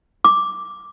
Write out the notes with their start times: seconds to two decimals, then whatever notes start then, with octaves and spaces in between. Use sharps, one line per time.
0.25 D6